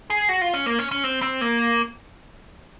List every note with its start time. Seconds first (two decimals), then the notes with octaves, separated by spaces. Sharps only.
0.10 G#4
0.29 F#4
0.41 F4
0.54 C#4
0.66 A#3
0.79 C#4
0.91 C#4
1.04 C4
1.22 C4
1.41 A#3